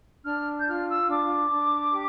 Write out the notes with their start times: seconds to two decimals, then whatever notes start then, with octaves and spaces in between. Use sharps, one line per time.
0.25 D4 F6
0.59 G6
0.67 F4 F6
0.88 E6
1.09 D4 D6
1.51 D4
1.93 G4